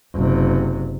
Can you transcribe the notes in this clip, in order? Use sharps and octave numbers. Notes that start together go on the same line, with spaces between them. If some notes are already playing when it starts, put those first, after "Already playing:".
F#1 C3